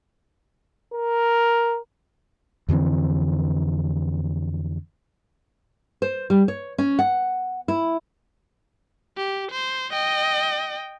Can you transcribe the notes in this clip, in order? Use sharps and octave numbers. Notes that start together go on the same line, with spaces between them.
A#4
F2 D3 E3 C4
C5
G3
C#5
C#4
F#5
E4
G4
C5
D#5 G5